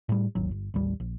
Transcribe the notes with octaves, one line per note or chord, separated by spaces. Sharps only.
A2 G3
D1 G#1 D#2 F#3
G1
A1 D#2 G3
A#1